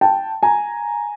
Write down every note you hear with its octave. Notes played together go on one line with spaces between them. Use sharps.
G5 A5
G#5 A#5